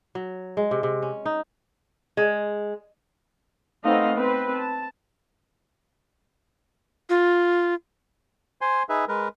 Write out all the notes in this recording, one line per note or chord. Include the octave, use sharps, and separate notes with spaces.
F#3
G#3
C3
C3
C#4
D#4
G#3
A3 B3 C4 D#4 D#5 F5
C4 B4
A5
F4
C5 G#5 C6
D#4 G#4 B4 E5
G#3 A#4 B4